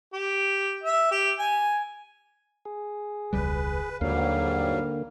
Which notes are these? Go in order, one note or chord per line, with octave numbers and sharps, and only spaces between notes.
G4
E5
G4
G#5
G#4
E1 C#2 G3 B4
D#2 G#2 D3 F#3 G3 A#3 F5